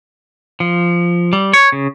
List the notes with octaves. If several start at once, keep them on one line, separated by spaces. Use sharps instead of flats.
F3
G3
C#5
C#3